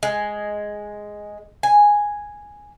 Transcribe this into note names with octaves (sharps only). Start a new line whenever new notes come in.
G#3
G#5